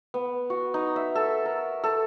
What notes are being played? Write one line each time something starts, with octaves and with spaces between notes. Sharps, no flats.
B3
F#4
D#4
E5
A4
A#4
A4